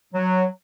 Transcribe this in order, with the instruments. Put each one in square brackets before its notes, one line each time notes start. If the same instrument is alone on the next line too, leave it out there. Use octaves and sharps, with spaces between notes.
[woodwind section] F#3